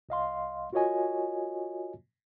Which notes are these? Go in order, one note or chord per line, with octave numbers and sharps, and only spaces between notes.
C2 D#5 F5 C6
F4 F#4 A#4 C#5 D#5 G#5